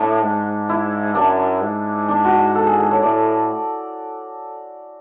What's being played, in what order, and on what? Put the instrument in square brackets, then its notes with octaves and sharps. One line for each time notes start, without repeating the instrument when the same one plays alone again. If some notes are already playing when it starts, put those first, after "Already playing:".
Already playing: [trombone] A2 [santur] D4
[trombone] G#2
[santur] E4
[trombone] F#2 [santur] D4
[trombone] G#2
[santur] D4
F#4
A4
G#4
A4
C#5
[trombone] A2 [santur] D5